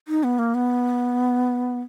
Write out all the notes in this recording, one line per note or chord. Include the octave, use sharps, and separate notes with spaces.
D#4
B3
A#3
B3